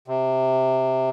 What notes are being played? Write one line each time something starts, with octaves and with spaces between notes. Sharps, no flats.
C3